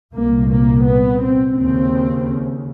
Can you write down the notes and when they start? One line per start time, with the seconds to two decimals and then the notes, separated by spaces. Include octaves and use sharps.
0.15 C2 A#2 A#3
0.51 A#3
0.86 B3
1.22 C4
1.57 D#2 C#3 C4